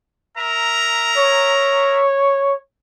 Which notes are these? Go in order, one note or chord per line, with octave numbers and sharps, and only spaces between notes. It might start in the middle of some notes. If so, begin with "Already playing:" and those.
A#4 E5 A#5
C#5